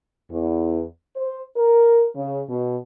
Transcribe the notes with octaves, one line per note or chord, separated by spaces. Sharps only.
E2
C5
A#4
C#3
B2